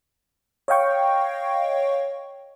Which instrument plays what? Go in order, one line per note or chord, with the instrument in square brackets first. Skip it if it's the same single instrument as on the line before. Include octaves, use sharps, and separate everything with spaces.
[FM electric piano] C#5 D#5 F5 G5 C#6